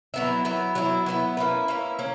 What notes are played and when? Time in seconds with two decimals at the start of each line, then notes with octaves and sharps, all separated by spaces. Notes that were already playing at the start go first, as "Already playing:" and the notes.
0.14 F#3 B3 E4
0.45 F#3 B3 E4
0.75 F#3 B3 E4
1.06 F#3 B3 E4
1.37 A#3 C#4 E4 B4
1.68 A#3 C#4 E4 B4
1.99 A#3 C#4